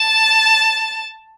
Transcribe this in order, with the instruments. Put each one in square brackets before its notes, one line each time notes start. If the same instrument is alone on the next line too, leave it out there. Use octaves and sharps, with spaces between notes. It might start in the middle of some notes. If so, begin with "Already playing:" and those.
Already playing: [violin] A5